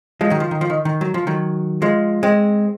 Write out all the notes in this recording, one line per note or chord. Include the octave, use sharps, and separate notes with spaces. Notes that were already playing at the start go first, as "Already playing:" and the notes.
F3 G#3
D#3 F#3
F3
D#3
F3
D#3
D#3
F#3
F3
D#3 F#3
F3 G#3
G#3 C4